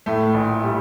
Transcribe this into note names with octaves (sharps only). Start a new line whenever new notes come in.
A2 A3
A#1
G3